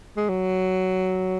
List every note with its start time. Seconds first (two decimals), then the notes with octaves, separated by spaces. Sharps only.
0.16 G#3
0.29 F#3